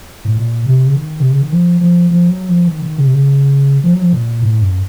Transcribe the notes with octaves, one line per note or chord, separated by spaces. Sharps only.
A2
A#2
C3
C#3
D#3
C3
C#3
D#3
F3
F3
F3
F#3
F3
D#3
D#3
C#3
C3
C#3
F3
F#3
F3
A#2
A2
F#2